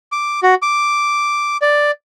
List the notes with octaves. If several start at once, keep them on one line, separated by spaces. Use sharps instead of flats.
D6
F#4
D6
D5